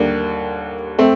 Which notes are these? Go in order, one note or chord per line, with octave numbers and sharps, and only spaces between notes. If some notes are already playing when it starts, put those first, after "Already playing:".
Already playing: D#2 D3 G3 A#3
A3 C4